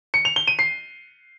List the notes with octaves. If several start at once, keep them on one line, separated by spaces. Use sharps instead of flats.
C#7
F7
G7
D#7
C7